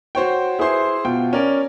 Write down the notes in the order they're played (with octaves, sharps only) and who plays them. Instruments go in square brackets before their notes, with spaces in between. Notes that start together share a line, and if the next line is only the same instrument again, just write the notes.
[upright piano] F#4 C5 C#5 G5
E4 G#4 B4 C5 C6
B2 F4 G5
C#4 A#4 D5